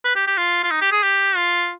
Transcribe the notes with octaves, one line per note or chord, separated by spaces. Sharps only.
B4
G4
G4
F4
F4
D#4
G4
G#4
G4
F4